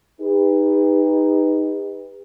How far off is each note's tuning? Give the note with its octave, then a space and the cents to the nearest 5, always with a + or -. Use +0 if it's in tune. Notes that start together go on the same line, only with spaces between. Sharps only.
D#4 +5 G4 +45 B4 +0